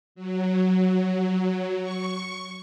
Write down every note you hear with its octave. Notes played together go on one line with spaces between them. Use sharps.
F#3
C#6